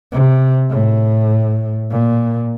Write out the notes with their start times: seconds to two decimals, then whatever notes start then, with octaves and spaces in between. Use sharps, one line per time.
0.12 C3
0.70 A2
1.91 A#2